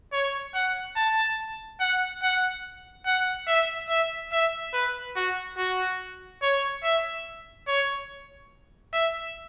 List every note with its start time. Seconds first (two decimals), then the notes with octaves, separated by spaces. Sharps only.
0.12 C#5
0.54 F#5
0.96 A5
1.80 F#5
2.23 F#5
3.06 F#5
3.47 E5
3.89 E5
4.32 E5
4.73 B4
5.16 F#4
5.57 F#4
6.42 C#5
6.84 E5
7.68 C#5
8.93 E5